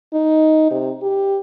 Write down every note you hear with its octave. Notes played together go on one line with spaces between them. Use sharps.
D#4
C3
G4